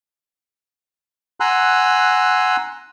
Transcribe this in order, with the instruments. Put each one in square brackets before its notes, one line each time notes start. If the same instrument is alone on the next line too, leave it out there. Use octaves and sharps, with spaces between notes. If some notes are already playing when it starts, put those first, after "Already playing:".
[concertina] F#5 G#5 A#5 C6 E6 F#6